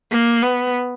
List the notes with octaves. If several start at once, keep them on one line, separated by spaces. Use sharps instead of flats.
A#3
B3